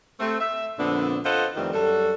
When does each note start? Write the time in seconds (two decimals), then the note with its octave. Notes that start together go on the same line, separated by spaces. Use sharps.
0.20 A3 C4
0.39 E5
0.78 F2 A#2 D3 B3 C4 D4
1.24 F4 A4 B4 C5 D#5 F#5
1.56 F2 D#3 E3 G3 A3 C4
1.73 F#2 G3 F#4 A4